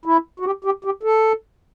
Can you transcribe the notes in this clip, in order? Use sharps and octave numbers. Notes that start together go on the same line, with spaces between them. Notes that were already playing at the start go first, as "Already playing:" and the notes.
E4
F#4
G4
G4
G4
A4